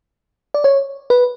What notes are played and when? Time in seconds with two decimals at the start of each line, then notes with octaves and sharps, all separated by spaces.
0.54 D5
0.64 C#5
1.10 B4